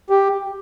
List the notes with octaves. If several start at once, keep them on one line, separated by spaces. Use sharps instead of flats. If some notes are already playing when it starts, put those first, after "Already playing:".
G4